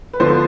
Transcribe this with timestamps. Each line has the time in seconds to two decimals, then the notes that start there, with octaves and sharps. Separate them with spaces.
0.13 B4
0.20 D3 F3 B3 C5